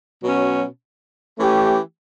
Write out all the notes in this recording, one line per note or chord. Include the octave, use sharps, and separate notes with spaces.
B2 F#3 C#4 F#4
E3 A3 C#4 G4